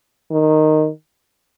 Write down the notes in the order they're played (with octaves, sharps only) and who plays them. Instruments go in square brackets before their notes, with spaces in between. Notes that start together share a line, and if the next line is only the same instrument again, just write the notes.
[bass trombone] D#3